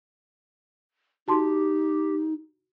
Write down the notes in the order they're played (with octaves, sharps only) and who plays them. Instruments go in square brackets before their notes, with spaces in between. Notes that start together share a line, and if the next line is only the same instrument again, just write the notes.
[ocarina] D#4 [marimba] F#4 A5 C6 [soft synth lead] G4